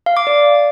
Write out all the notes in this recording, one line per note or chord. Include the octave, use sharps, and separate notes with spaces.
F5
D6
D5